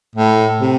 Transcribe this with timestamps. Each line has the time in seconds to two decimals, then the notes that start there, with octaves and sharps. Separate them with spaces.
0.16 A2
0.60 C3